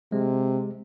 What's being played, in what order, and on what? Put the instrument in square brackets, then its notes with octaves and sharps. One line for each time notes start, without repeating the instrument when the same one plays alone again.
[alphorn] C3 [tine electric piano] G#3